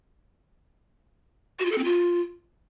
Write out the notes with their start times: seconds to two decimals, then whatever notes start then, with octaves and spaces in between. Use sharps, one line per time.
1.59 F#4
1.66 F4
1.72 A4
1.78 C4
1.84 F4